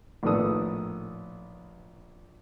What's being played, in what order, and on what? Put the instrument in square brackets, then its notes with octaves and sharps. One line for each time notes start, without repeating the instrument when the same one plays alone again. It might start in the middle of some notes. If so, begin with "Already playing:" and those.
[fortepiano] A#1 A2 D#3 B3 A4 D#6